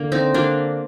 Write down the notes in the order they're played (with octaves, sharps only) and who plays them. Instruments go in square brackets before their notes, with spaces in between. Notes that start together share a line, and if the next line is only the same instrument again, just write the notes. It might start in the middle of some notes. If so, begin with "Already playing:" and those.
Already playing: [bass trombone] D3 [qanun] A#3
[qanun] C4 D#4
A#3 D4